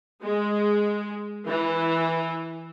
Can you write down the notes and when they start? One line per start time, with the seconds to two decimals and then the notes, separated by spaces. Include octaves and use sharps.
0.22 G#3
1.47 E3